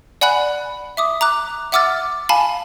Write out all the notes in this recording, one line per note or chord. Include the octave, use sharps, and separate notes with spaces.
D5 F#5 G#5 B5 F#6 F#7
E5 D6 D#6
A#5 D6 F#6
E5 F#5 D6 E6 F6 A6
F5 G#5 A5 B5